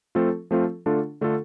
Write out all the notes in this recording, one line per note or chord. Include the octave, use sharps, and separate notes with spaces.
F3 A3 C4 F4 A4
F3 A3 C4 F4 A4
D3 A3 D4 F4 A4
D3 A3 D4 F4 A4